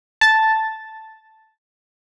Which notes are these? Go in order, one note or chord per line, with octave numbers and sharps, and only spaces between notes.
A5 A6